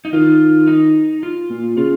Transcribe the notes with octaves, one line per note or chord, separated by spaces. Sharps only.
D#4
D#3 F4
D#4
F4
A#2
C#3 F4